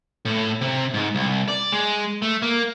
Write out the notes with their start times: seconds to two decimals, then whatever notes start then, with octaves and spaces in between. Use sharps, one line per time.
0.25 A2
0.61 C3
0.94 G#2
1.15 C2
1.48 D5
1.72 G#3
2.22 A3
2.42 A#3